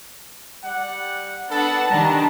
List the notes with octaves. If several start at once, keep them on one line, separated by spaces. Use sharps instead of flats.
G3 D5 F#5
B3 D4 A4 B4 F#5 A5
D#3 G3 D4 A#5